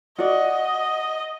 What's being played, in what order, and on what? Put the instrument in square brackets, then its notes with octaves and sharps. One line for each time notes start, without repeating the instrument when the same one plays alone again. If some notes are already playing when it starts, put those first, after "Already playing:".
[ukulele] F#4 D5 [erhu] D#5